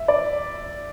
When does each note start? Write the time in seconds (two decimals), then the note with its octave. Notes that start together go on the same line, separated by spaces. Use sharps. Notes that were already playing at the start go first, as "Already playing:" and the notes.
Already playing: E5
0.08 D5